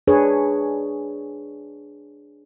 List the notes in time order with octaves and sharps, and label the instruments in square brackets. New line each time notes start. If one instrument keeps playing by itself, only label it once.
[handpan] D4 G#4 B4 C#5